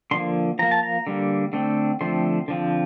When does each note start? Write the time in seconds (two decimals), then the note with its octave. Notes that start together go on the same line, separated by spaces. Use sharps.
0.11 D3 F3 A#3 C6
0.59 F3 A#3 A#5
0.71 A5
0.83 A#5
1.07 D3 G3 A#3
1.53 D3 A3 C4
2.01 D3 F3 A3 C4 C6
2.48 D3 F3 C4